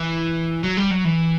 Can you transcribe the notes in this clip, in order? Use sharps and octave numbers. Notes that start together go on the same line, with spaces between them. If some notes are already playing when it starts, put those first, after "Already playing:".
Already playing: E3
F#3
G3
F#3
E3